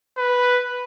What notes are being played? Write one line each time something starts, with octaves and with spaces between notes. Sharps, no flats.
B4